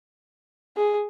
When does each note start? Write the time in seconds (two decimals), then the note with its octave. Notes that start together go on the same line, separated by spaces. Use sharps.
0.76 G#4